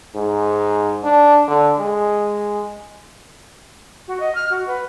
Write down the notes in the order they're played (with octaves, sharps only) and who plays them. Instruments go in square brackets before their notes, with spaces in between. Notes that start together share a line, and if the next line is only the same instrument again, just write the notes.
[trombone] G#2
D4
D3
G#3
[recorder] F#4
D#5
F6
F#4
B4